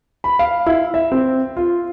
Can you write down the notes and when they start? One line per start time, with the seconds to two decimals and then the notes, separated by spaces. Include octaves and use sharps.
0.24 B5
0.39 F5
0.66 E4
0.94 E5
1.12 C4
1.57 F4